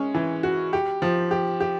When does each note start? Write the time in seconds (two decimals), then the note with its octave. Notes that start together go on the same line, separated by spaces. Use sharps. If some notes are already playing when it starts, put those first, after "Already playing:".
Already playing: G#3 C#4
0.14 E3
0.43 F#4
0.73 G4
1.02 F3
1.31 G4
1.60 G4